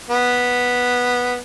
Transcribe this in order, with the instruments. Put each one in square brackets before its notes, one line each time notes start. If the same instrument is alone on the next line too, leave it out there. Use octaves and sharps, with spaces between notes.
[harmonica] B3